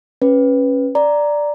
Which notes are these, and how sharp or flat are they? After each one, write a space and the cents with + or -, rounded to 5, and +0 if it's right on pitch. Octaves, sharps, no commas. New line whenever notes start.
C#4 -15 B4 +0
D5 +0 A#5 +0